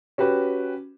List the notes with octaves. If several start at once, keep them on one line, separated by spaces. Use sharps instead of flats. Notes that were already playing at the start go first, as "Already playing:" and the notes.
C#4 F#4 G4 B4